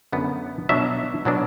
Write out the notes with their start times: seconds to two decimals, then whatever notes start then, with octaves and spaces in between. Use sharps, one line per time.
0.12 F#2 D3 B3
0.69 B2 F#3 B3 D4 E5
1.25 B2 F#3 B3 D4